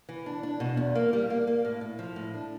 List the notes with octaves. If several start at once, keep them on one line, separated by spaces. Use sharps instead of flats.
E3
D4
D4
B2
E2
A#3
G3
A#3
A#3
A2
A2
F3
A2
D4